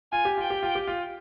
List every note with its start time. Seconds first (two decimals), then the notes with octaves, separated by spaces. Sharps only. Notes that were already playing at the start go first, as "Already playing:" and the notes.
0.12 F4 G#5
0.25 G4
0.37 F4 G5
0.50 G4
0.63 F4
0.75 G4
0.87 F4